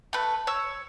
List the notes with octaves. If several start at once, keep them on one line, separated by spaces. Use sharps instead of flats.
A3 B4
C#5 E6